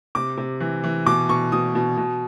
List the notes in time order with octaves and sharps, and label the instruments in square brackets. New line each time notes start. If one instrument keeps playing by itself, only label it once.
[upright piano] C3 D6
C3
E3
E3
B2 D6
B2 C#6
B2 D#6
B2
B2